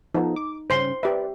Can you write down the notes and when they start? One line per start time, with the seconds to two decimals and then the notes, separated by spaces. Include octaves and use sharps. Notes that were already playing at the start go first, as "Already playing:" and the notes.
0.15 F3 B3 D#4 A4
0.36 D6
0.70 G2 C#3 C#4 C5 C6
1.03 G4 B4 D5 E5